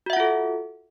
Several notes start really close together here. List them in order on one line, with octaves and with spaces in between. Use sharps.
F#4 E5 F#5 F4 A4